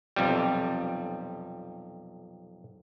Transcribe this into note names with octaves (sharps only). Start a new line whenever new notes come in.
B1 F2 C3 G3